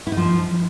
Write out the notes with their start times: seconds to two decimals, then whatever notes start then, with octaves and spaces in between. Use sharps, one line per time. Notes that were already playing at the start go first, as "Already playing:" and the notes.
0.07 E4
0.12 D#4
0.17 F3